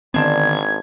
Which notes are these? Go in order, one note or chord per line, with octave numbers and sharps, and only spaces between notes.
G#1 D3 D#3 B3 C4 D4 C5 G#6